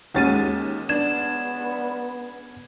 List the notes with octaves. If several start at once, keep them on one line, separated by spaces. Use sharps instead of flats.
D#2 G#3 C#4 F#4 A6 D#7
B3 D4 G#6 E7